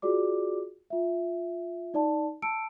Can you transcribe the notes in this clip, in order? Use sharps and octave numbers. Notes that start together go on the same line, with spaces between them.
F4 F#4 G#4 D5 D6
F4 E5
D#4 D5 A5
A5 E6 C#7 D7